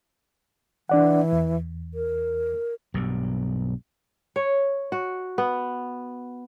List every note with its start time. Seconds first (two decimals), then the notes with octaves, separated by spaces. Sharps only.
0.89 E3 D4 D5 F#5
1.32 E2
1.94 A#4
2.94 B1 G2
4.36 C#5
4.92 F#4
5.38 B3